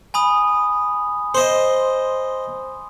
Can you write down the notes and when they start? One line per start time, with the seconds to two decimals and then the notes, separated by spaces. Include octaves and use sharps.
0.14 G#5 B5 D#6
1.35 C5 D#5 C6